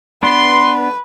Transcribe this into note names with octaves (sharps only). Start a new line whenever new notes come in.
B3 D4 B4 C6